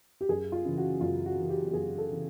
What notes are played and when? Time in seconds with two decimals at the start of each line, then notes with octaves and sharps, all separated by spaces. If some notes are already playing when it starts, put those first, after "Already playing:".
0.21 G4
0.29 F#2 G#4
0.52 F4
0.65 C#3 E3
0.77 F#4
1.01 F#2 F4
1.26 F#4
1.37 C#3 E3
1.49 G4
1.73 F#2 G#4
1.98 A4
2.11 C#3 E3